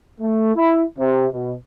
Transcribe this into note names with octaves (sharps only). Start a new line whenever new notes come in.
A3
E4
C3
B2